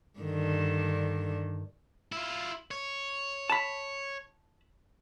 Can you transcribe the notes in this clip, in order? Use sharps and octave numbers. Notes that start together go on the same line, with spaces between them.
G2 D3 D#3
E4 F4
C#5
A5 B5